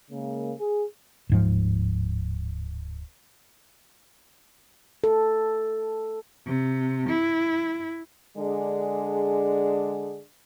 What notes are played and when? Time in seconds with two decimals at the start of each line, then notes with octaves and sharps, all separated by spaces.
0.11 C#3 G#3 A#3
0.60 G#4
1.29 D1 G#2 F3
5.04 A4
6.47 C3
7.10 E4
8.37 D3 G#3 D4 G#4